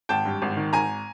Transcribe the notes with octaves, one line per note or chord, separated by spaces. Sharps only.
G#1 G5 A5
G2
G#1
D#3
G#1 G#5 A#5